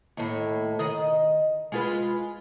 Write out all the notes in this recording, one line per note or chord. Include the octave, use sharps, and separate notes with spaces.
D#2 A2
D#3 D#5
G#3 F4 B4